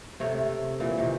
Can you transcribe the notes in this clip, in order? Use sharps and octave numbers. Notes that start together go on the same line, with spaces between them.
C3 A3 C#5
A#2 E3
C3 D#3